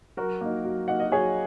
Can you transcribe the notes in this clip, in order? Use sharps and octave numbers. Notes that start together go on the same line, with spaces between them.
F#3 F#4 A#4
A#3 D#4
F#3
A#3 D#4 F#5
D#5
F#3 G#4 C#5